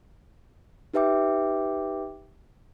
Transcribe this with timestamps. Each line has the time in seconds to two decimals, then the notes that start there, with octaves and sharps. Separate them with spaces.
0.94 D#4 G4 B4 E5 G5 D6